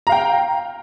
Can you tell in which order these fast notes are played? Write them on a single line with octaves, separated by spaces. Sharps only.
A#5 F5 G5